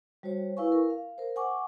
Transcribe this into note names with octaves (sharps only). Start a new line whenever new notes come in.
G3 F#4 C5 C#5
E4 B4 F5 G#5 C#6
A#4
F5
A#4 C5
F#5 G#5 C#6 D6